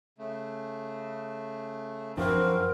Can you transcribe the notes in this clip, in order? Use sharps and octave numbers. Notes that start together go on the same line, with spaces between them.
C#3 A3
F#2 F3 C4 D4 F4 F#4 A#4 B4